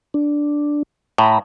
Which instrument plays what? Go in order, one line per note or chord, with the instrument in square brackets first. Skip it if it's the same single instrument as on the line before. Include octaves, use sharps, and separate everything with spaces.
[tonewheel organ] D4
[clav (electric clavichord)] A2 [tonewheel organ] A#5 B5